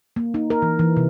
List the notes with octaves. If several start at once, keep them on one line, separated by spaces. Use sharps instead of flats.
A#3
D#4
A#4
E3
E3
C3